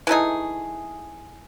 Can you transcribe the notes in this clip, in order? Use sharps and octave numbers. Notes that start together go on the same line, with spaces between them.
E3 A3 D#4 G#4